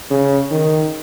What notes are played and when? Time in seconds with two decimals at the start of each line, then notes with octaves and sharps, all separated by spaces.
0.10 C#3
0.51 D#3